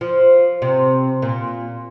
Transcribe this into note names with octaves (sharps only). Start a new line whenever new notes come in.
F3
C3
A#2